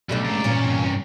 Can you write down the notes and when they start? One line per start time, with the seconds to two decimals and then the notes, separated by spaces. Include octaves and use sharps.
0.09 B1 G3 A3 D4
0.25 C#3 G#3 D5 A#5
0.44 A#2 E3 F3 C#4
0.64 G2 C3